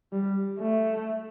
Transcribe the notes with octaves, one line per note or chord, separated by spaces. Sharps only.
G3
A3